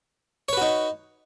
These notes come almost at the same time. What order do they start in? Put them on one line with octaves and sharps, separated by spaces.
C#5 B4 F#4 D#4